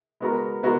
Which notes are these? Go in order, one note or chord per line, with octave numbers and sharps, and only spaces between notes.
G#3 B3 F#4 A#4
G#3 B3 F#4 A#4